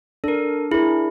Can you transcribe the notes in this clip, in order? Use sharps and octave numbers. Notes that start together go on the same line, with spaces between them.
D4 A4 A#4
E4 G#4 A#4